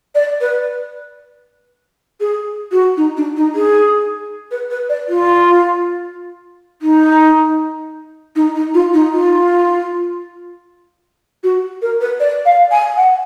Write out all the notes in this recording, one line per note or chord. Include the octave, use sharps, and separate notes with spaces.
D5
B4
G#4
F#4
D#4
D4
D#4
G#4
B4
B4
D5
F4
D#4
D#4
D#4
F4
D#4
F4
F#4
A#4
B4
D5
F5
G#5
F#5